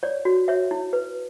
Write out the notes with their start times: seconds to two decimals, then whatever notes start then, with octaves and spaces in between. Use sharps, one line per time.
0.03 C#5 D5
0.25 F#4
0.48 C#5 E5
0.71 E4
0.93 B4